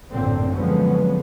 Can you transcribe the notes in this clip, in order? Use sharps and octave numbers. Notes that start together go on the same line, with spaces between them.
A1 F#2 A#2 D3 C4
D3 F3 F#3 G#3 B3 C#4